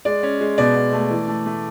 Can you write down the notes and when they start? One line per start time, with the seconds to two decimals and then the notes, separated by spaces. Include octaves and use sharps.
0.05 G#3 D5
0.23 C#4
0.41 G#3
0.58 B2 D5
0.75 B2
0.93 A3
1.10 E3
1.28 A3
1.46 A3